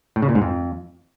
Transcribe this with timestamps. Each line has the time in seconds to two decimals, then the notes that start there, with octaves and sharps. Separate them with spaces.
0.16 A2
0.22 C#3
0.29 A#2
0.35 G#2
0.42 F2